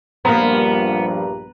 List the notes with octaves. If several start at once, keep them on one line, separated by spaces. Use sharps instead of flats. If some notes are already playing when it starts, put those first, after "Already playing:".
A#1 G2 F3 G3 A#3 B3 A#5